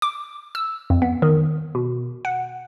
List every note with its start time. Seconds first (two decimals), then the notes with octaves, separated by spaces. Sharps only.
0.02 D6
0.55 E6
0.90 F2
1.02 B3
1.22 D#3
1.75 B2
2.25 F#5